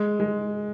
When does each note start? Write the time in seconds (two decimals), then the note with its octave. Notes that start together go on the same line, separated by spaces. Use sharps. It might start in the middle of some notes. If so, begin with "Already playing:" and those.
Already playing: G#3
0.20 G#3